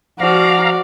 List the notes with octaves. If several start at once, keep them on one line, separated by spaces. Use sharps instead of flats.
F3 F#4 D5 F5 A#5